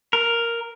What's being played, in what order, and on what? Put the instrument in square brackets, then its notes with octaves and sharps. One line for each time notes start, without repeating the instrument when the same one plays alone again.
[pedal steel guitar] A#4